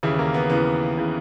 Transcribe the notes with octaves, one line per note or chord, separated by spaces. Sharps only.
D#2 C#3 E3 E4
A#3
B3
D#2 C#3 E3 B3
C#3 E3